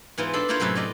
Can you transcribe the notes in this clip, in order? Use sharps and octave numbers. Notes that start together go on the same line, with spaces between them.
G#2 E3 B3 F4
D4 A4 E5 B5 C6
A#3 D4 E4 F4 C5 C#5
F#2 A2 C3 B4 C#5
F4 B4 D5 D#5